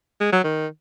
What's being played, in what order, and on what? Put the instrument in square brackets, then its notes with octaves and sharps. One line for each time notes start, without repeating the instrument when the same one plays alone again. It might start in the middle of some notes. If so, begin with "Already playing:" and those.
[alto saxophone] G#3
F#3
D#3